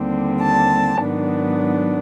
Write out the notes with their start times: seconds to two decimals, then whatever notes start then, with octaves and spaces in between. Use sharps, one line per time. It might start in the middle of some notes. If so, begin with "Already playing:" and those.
Already playing: D#2 D3 G3 C4
0.42 A5
1.01 G#2 D#3 F#3 B3 D4